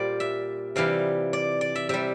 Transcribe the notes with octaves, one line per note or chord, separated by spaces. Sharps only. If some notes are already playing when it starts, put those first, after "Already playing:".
Already playing: A#2 G3 C5 D5
E5
C3 E3 G3 F5
D5
D5
E5
C3 G3 E5